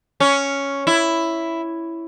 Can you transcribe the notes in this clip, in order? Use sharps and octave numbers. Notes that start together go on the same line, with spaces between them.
C#4
E4